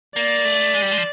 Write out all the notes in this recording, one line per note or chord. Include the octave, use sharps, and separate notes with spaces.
A#3 D5
A3
G#3
G3
G#3
F3